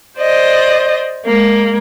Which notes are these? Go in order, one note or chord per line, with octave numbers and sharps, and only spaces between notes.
C5 D5 D#5
G#3 A#3